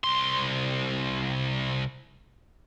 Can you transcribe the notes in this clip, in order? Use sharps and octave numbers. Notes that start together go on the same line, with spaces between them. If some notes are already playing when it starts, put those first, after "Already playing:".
C2 C6